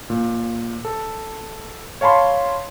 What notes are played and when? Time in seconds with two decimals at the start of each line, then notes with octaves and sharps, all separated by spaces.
0.10 A#2
0.85 A4
2.01 C#5 F5 A5 B5 C6